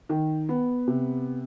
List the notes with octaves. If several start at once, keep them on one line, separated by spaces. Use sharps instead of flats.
D#3
B3
C3